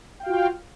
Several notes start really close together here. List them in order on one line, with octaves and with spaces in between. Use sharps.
G5 F5 F#4 F4